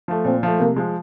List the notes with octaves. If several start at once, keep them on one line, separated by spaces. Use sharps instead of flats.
F3 A3
A#2 C4
F3 A3
C3 A#3
F3 G#3